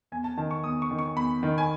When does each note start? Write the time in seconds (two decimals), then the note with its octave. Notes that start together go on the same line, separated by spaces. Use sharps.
0.12 E2 G#5
0.24 A5
0.37 D#3 A5
0.51 C#6
0.63 E2 D#6
0.82 C#6
0.91 D#3
0.99 C#6
1.16 E2 B5
1.43 D#3
1.58 G#5